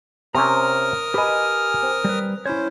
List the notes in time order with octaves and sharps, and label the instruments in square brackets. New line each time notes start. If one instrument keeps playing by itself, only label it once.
[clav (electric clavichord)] C3 C4 C#4 [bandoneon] A#4 D#6 F6 [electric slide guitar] A#5
[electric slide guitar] G4 G#5 [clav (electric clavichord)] B4 D#5
[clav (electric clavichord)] C4
[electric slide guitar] G3 B4
[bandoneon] C#4 C5 [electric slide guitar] E4 C#5